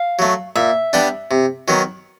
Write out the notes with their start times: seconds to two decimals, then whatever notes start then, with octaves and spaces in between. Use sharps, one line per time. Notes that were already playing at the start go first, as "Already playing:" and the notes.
Already playing: F5
0.19 F#3 A3
0.56 A#2 E5
0.93 G3 B3 D4 G4
1.31 C3
1.68 D#3 F#3 B3